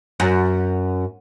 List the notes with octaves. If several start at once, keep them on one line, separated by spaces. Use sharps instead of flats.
F#2